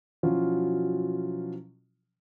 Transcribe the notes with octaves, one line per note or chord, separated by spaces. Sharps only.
B2 F3 F#3 C#4 E4 F4